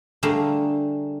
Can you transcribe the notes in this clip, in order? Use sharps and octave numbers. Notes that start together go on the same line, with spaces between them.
D3 G3 A3 G#4 A#4 F5